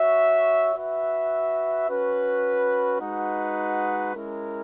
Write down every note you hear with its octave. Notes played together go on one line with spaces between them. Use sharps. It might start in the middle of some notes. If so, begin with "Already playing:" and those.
Already playing: F#4 C#5 E5
F#4 B4 E5
C#4 F#4 B4
G#3 D#4 F#4 B4 F#5
G#3 C#4 E4 A#4